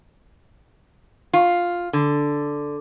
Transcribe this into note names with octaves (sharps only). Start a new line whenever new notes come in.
F4
D3